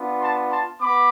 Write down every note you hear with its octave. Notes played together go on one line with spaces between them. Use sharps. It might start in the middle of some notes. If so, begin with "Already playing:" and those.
Already playing: B3 D4 F4
A5 C6
A5 C6
B3 B5 D6